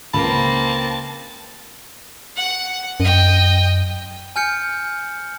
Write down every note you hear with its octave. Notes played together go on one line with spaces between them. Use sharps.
C#2 A#3 C4 A5 B5
F#5
F#2 D#5 G5
G#5 F6 G6 C#7